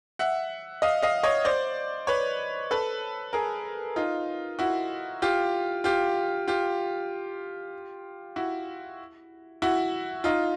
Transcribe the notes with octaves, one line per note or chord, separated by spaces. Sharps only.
E5 F#5
D#5 F5
D#5 F5
C#5 D#5
C5 D5
B4 C#5
A4 B4
G#4 A#4
D#4 F4
E4 F#4
F4 G4
F4 G4
F4 G4
E4 F#4
E4 F#4
D#4 F4